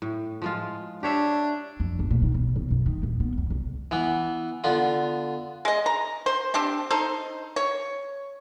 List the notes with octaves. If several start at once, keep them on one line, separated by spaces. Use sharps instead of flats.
A2
F3 G#3 F4
D4 G4 C#5 E5
F2
G1
A#2
D#3
B1
B2
F#2
D#3
D#1
B3
E2
C2
E3 B3
D3 B3 F4
G#3 D#5
A#5
C5
C4 D4 G4 C5
D#4 A4 C5
C#5